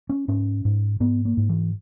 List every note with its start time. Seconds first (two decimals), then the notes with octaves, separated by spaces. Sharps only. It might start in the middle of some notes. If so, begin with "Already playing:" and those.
0.09 C#4
0.28 G#2 C#4
0.65 G#2
1.00 G#2 B3
1.25 A#3
1.37 G#2
1.49 E3